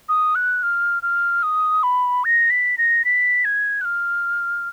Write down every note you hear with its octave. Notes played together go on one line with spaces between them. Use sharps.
D#6
F#6
F6
F6
D#6
B5
A#6
B6
A#6
B6
G#6
F#6
F6